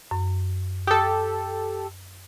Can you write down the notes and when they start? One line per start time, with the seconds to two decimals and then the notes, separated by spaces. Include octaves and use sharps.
0.11 F#2
0.87 G4 A4 D#6